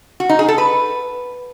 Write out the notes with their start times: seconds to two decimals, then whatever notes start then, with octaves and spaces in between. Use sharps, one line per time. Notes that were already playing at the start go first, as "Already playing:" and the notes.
0.20 F#4
0.29 D#4
0.39 G#4
0.48 A4
0.58 B4